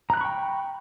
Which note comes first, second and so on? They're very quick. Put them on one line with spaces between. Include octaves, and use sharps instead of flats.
A#5 F#6 B5 C#6 G5